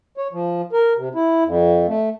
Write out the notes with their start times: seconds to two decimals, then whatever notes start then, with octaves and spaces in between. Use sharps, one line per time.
0.17 C#5
0.33 F3
0.73 A#4
0.97 C3
1.15 E4
1.45 F2
1.88 A3